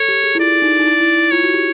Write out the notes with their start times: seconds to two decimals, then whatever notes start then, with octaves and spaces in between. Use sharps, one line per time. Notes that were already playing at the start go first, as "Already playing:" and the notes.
Already playing: A4 C#5
0.08 G4
0.24 G#4
0.35 E4
0.39 F4 D5
0.54 E4
0.62 D#4
0.79 D#4
0.85 E4
1.01 E4
1.16 E4
1.31 F4 C#5
1.43 F#4
1.54 G4